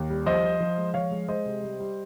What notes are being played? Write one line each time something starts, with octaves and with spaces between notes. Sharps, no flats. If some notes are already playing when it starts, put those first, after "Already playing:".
Already playing: D#2
G3
F3 C5 D#5
F3
F3
G#3
F3 C#5 F5
G#3
G#3 C5 D#5
C3
G3
G3